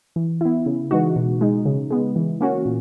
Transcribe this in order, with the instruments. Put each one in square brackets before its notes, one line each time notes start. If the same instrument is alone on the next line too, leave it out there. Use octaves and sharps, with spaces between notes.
[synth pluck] E3
B3 E4
C#3
E3 G#3 D#4 F#4
B2
G#3 D#4
C#3
G#3 B3
E3
A#3 C#4 F#4
A#2